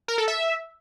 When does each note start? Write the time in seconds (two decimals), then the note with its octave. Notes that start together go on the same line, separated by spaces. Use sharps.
0.08 A#4
0.18 A4
0.28 E5